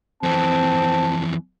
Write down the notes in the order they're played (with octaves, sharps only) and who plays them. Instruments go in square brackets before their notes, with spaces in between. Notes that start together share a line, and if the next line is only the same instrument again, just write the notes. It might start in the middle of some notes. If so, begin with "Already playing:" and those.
[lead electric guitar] F2 E3 [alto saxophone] C4 [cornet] A5